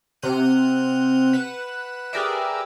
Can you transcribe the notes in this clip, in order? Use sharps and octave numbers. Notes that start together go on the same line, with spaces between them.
C3 F#5 F6 G6 D#7
B4 F#5 F#6 E7
G4 G#4 A#4 B4 D5 E5